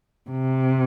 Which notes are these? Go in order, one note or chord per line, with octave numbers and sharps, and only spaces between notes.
C3